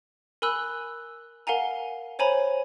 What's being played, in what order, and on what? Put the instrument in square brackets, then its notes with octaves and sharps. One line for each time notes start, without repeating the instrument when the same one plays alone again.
[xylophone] A#4 G#5 B5 E6 F#6
A#4 F5 F#5 G#5 A#5
C5 C#5 G#5 A#5 B5